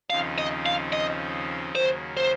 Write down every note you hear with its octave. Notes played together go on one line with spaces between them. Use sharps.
D#2 C#3 F3 C4 D#4 F5
D#5
F5
D#5
D#2 C#3 F#3 A#3 C5
C5